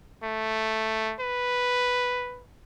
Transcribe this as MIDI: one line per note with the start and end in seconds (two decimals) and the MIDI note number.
0.23 1.15 57
1.20 2.44 71